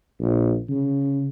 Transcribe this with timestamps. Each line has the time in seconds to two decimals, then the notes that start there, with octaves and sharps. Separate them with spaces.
0.20 A#1
0.70 C#3